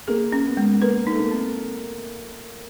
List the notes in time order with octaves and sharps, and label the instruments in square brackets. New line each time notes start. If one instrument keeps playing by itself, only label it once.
[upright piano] A#3 [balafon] G#4
[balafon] C#4
[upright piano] B3
[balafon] G#3
[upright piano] A#3 [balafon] B4
[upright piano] A3 [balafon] D#4
[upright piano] A#3
[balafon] C4